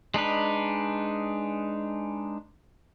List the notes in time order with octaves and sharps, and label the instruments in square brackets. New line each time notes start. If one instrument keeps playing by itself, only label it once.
[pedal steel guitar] G#3 D4 D#4 B4